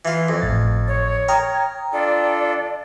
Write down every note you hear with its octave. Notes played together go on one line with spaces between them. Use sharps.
E3 F4
F2
G#1 A2 A6
C#5
A#4 G5 A#5 D#6
D4 F4 A4 D5